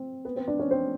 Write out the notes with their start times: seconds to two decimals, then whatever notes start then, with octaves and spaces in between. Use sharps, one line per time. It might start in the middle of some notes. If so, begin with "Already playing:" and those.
Already playing: C4
0.25 B3 B4
0.36 C4 C5
0.48 D4 D5
0.59 C#4 C#5
0.71 C4 C5